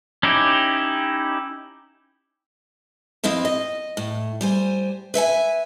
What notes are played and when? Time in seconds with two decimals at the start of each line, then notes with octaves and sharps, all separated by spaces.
0.23 C#4 D#4 E4 G4
3.24 F2 C4 E4 D#5 F5
3.45 D#5
3.97 A2
4.41 G3 C5 G#5
5.14 B4 E5 G5 G#5